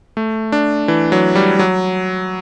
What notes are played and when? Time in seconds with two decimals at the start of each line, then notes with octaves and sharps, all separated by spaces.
0.17 A3
0.52 D4
0.88 E3
1.12 F#3
1.35 G3
1.59 F#3